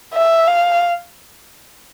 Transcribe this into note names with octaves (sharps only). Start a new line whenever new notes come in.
E5
F5